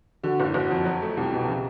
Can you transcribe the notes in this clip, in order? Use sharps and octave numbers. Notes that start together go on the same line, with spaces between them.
D3 F#4
F#1
F#1 F#4
F2
F#3
A3
C2 G4
B2
C#3